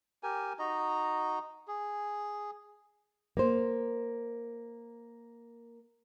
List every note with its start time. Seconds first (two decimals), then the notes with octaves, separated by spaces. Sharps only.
0.23 G4 A#4 G#5
0.59 D#4 F#4 D#5 A#5
1.68 G#4
3.37 A#3 C5